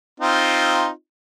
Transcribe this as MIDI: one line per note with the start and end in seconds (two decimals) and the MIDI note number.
0.20 0.89 60
0.20 0.89 63
0.20 0.89 65